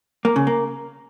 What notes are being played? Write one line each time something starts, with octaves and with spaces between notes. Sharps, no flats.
A#3
C#3
A#3